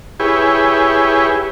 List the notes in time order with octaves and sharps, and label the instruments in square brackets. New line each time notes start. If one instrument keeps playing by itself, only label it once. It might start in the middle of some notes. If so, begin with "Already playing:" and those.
[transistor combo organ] E4 G4 G#4 B4 C#5